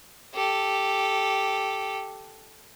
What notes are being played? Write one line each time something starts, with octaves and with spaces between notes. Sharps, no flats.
G4 A4